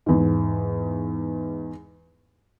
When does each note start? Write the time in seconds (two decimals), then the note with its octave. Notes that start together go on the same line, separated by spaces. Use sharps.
0.06 E2 G#2